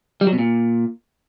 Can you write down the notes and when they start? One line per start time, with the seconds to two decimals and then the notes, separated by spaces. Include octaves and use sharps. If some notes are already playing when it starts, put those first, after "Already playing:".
0.21 G3
0.27 F#3
0.33 B2
0.39 A#2